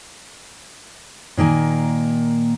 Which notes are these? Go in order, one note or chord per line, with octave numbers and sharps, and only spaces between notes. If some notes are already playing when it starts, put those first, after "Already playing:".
A#2 D#3 A#3 G#5